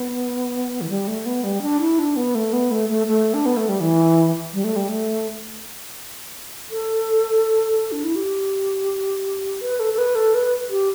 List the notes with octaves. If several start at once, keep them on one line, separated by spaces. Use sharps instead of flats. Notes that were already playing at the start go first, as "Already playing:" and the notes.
Already playing: B3
E3
G3
A3
B3
G3
D4
E4
D4
B3
A3
B3
A3
A3
A3
D4
B3
A3
G3
E3
G3
A3
G3
A3
A4
D4
E4
G4
B4
A4
A4
B4
A4
B4
G4